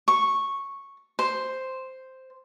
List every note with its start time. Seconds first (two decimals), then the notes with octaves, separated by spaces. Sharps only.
0.08 C#6
1.19 C5